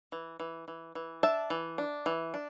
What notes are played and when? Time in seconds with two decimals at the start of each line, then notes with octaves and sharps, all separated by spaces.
0.12 E3
0.40 E3
0.68 E3
0.95 E3
1.23 D4 E5 A5
1.50 E3
1.78 D4
2.06 E3
2.34 D4